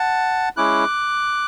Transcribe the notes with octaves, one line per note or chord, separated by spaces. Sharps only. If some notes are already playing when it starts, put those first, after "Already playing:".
Already playing: F#5 A5
G#3 C#4 E4 D6 F#6